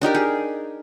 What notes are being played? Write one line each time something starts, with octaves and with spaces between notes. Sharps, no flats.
D4 D#4 G4 A#4
G#4